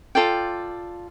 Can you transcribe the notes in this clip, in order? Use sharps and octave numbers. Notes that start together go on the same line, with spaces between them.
F4 A4 D5 G5